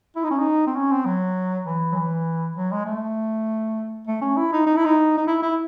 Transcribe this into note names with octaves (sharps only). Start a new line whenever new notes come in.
E4
D#4
C#4
D#4
C4
C#4
C4
F#3
E3
F#3
E3
F#3
G#3
A3
A3
C#4
E4
D#4
D#4
E4
D#4
D#4
E4
E4